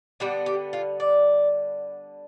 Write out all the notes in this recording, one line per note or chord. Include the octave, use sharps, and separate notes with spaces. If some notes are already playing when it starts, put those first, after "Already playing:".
D3 G3 B3 G4
G4
F4
D5